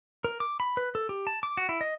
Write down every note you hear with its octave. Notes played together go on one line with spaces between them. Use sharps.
A#4
D6
B5
B4
A4
G4
A5
D6
F#4
E4
D#5